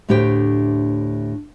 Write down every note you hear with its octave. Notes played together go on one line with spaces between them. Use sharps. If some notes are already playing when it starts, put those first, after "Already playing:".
D2 A2 D4 G4 C5 G5